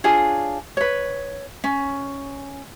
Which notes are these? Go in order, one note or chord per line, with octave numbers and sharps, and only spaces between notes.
D4 F4 G#4 C#5
B4 C#5
C#4